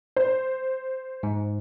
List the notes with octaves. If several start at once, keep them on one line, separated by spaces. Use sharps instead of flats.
C5
G#2